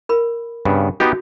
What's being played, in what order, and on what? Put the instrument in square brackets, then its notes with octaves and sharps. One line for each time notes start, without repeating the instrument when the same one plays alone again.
[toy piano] A#4 B5
[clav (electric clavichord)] G2 C#3 B3
[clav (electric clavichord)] B3 D#4 G4 [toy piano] F#4